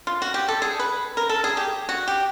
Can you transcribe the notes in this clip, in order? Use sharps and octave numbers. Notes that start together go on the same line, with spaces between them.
F4
F#4
G4
A4
G#4
B4
A#4
A4
G#4
G4
F#4
G4